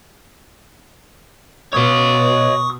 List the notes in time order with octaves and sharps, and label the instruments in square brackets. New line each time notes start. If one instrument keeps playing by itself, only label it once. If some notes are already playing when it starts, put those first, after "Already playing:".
[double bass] B2 [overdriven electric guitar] C#5 D#5 [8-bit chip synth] C#6 D#6